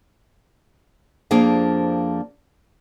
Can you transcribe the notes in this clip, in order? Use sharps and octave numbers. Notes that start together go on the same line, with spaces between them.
F2 F3 A#3 D4 G#4 F5